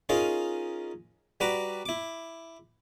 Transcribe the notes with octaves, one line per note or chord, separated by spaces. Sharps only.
C#4 D#4 F4 G#4 A#4
G3 F#4 B4 A#5 D6
E4 D6